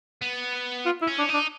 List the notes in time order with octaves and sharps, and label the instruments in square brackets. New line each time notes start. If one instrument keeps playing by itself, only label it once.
[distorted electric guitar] B3
[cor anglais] F4
E4
[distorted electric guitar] C#4
[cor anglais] D4
[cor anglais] D4 [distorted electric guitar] D#4